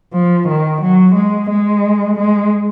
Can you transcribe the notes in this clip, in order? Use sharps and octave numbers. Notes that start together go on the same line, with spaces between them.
F3
D#3
F#3
G#3
G#3
G#3